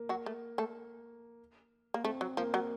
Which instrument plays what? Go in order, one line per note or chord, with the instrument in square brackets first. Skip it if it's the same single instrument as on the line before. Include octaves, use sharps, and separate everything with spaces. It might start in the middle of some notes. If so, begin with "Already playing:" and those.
Already playing: [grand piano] A#3
[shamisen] F#3 F#4
A3
A3 A4
A#3
[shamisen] A3 [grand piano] C4
[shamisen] F#3
[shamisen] F3 [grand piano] A#3
[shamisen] F#3